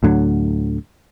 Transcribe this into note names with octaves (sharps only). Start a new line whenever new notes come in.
D2 A2 D3 F#3